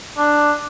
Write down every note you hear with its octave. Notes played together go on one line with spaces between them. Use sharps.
D4